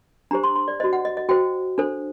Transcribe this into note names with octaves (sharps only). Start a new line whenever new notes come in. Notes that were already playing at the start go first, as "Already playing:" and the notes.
D4 G4 C5 A#5
C6
C6
D5
F#4 C5 D#5
F#5
D#5
D#5
F#4 C5 G5
D4 A4 C5